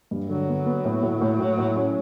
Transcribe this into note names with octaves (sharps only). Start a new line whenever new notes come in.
G2
F#3
D3
B3
B3
A2
A2
A2
A2
A2
C#4